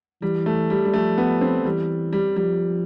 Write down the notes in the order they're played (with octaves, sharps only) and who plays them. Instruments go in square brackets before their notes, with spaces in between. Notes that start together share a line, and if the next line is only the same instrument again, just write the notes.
[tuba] E3 [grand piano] G3
[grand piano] A3
G3
G3
[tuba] F3 [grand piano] A3
[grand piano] B3
C4
[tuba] E3 [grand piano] G3
[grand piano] G3
[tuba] F3 [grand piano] G3